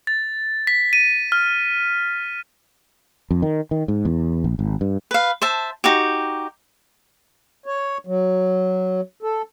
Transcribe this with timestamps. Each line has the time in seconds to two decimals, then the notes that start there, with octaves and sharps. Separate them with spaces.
0.07 A6
0.67 B6
0.93 D#7
1.32 F6
3.31 F2
3.42 D#3
3.71 D#3
3.88 G#2
4.05 E2
4.44 A#1
4.59 G#1
4.81 G2
5.11 B4 F5
5.42 C5 E5 A5
5.84 D#4 F#4 G4
7.66 C#5
8.07 F#3
9.23 A4